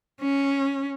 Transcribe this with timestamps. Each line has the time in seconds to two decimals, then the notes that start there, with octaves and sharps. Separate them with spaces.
0.22 C#4